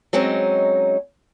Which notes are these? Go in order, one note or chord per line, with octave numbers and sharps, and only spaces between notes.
F#3 G#3 C4 C#4 D#4